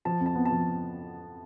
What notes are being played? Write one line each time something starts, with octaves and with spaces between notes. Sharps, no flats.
F3 A5
F2
A5
B3
A5
F3